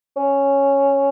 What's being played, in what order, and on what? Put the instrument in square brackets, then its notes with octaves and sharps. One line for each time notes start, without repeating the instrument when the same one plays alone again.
[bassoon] C#4